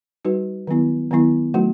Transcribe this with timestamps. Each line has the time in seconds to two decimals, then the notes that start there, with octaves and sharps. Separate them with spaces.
0.25 G3 D#4 F#4 B4
0.67 D#3 F#3 B3 E4
1.11 D#3 F#3 B3 E4
1.54 F#3 A3 D#4 F#4